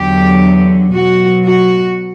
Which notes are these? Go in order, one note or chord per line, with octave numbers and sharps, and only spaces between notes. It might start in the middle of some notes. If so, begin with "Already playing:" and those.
Already playing: E2 D3 F#3 G4
B2 F#3 F#4
F#4